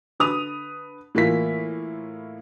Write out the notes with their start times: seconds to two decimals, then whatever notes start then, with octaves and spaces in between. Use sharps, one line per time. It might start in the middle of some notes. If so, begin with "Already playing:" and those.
0.20 D3 B4 D#6 F7
1.15 A2 E3 A#3 E4 F4 B6